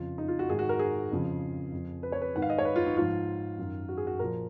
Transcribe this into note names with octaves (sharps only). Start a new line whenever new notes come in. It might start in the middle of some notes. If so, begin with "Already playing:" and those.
Already playing: F2 C#3 F3 F4
D#4
F4
F#4
G#2 D#3 G#4
F#4
A#4
G#4
F2 C#3 F3
F2 F3
B4
C#5
B4
G#2 D#3 F#5
F5
D#5
C#5
B4
F4
D#4
G#2 F3 F4
F#2 D#3
F#4
G#4
F#4
A#2 F3 A#4